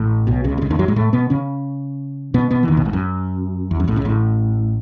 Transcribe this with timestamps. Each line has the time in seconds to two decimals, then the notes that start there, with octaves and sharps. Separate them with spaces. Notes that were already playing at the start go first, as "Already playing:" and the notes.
Already playing: A1 A2
0.27 B1 B2
0.44 C#2 C#3
0.58 B2
0.61 C#2 C#3
0.70 D#2 D#3
0.79 F#2 F#3
0.88 G#2 G#3
0.96 A2 A3
1.13 B2 B3
1.30 C#3 C#4
2.34 B2 B3
2.51 B2 B3
2.63 E3
2.68 D#2 D#3
2.77 B1 B2
2.85 G#1 G#2
2.93 F#2
3.71 E2
3.80 F#2
3.88 A1 A2
3.96 C#2 C#3
4.05 A1 A2